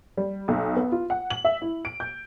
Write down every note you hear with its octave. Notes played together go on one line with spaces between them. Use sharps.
G3
B1
B3
F4
F#5
F#7
E5
E4
D7
G6